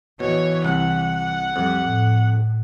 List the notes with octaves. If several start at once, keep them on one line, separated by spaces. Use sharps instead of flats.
B2 E3 C#5
C2 F#5
F2 G3
A2